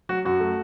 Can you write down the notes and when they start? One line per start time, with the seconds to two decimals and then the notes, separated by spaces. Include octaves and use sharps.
0.09 F#3 F#4
0.25 F#2 F#4
0.40 A3